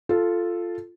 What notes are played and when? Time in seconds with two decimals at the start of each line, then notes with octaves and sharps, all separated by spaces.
0.09 F4 A4